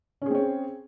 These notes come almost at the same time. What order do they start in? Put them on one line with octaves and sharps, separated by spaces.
C#4 G#4 C4 C#5